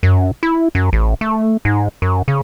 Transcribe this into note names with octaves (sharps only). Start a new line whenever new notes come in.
F#2
E4
F#2
A1
A3
G#2
F#2
C#3